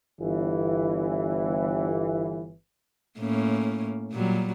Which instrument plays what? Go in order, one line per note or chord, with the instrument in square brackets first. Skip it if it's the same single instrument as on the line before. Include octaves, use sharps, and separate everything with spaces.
[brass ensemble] G1 E3
[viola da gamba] A2 A#3 C#4
A#2 F#3 G3